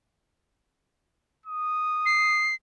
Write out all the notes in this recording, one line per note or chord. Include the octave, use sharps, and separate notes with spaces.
D#6
C7